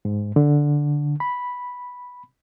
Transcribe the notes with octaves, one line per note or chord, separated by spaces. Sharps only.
G#2
D3
B5